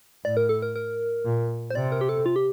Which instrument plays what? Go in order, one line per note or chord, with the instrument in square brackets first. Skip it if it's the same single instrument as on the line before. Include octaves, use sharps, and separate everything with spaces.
[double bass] A2 [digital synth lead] D5
[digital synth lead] A#4
A4
A#4
A#4
[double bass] A#2
[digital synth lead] C5
[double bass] C3 [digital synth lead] D5
[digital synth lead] A#4
G4
A4
F4
G4